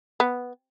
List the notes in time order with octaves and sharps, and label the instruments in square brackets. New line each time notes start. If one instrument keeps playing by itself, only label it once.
[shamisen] B3